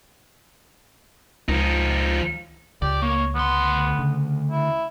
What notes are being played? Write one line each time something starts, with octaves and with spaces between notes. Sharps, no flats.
C#2 F3 D#4
C#2 G4 D5
A#3 C#5
D2 B3 C6
C#3
E4